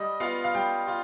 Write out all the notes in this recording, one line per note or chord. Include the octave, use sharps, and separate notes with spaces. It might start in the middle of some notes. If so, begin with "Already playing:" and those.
Already playing: G3 D#5
B3 F4 F5
F5
G3 G5
F4